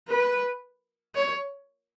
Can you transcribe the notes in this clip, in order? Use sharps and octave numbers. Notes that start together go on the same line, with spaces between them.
B4
C#5